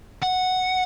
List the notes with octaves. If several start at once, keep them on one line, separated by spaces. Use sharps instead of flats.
F#5